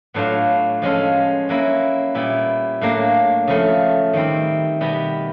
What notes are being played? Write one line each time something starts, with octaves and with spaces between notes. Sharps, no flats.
A2 F#3 B3 D4 F4
F3 G#3 C#4 F4 A4
F#3 A#3 C#4 E4
A#2 G3 B3 E4
A2 F#3 A#3 D4
C#3 F3 A3 C#4
D#3 G3 C4 E4
B2 G3 B3